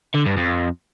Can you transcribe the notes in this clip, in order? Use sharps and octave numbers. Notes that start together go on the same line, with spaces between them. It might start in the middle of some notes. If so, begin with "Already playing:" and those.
D3
G2
F2